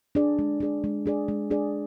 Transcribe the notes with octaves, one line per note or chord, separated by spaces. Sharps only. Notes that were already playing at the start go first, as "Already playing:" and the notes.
D4 G#4 D5
G#3
D4 G#4 D5
G#3
D4 G#4 D5
G#3
D4 G#4 D5